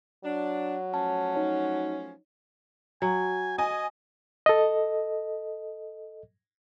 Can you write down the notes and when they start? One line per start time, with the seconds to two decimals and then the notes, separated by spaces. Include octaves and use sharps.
0.24 F#3 D4
0.94 F3 A3 C#4 A5
1.35 D#4 C#5
3.02 F#3 G#5
3.58 D#5 G#5
4.46 A4 D#5